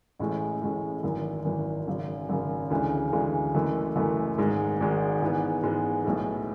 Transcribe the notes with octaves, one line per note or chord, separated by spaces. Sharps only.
A1 A2 G#3 C#4
A1 A2 G#3 C#4
G#1 F#2 E3
G#1 F#2 E3
G#1 F#2 C#3
G#1 F#2 C#3
D2 C#3 E3 G#3
D2 C#3 E3 G#3
F#1 F#2 E3 A3
F#1 F#2 E3 A3
G#1 G#2 G#3
G#1 G#2 G#3
G#2 E3 G#3 B3
G#2 E3 G#3 B3
B1 A2 G#3